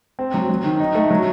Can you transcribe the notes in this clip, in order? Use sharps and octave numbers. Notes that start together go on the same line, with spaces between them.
C4
F#3
F#3
D#3
D#4
A3
F#3